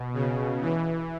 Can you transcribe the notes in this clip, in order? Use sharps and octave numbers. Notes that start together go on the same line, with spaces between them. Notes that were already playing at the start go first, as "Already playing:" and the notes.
Already playing: B2
C#3
E3